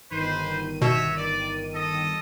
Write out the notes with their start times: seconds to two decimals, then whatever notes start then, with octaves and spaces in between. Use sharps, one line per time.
0.11 G1 D#3 B4 C5 D#7
0.82 B2 F#4 C#5 E5
1.16 D5
1.73 A4 D#5